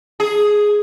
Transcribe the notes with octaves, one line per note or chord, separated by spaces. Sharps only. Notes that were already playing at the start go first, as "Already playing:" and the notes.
G#4